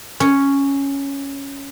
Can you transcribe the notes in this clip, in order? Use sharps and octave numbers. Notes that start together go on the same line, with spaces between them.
C#4